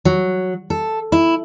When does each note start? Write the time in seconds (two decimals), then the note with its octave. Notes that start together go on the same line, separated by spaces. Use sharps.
0.05 F#3
0.70 A4
1.12 E4